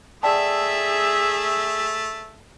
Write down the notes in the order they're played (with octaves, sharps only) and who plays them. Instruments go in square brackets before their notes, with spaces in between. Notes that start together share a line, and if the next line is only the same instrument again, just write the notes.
[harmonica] A3 [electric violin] G#4 E5 [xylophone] D5 G5 A5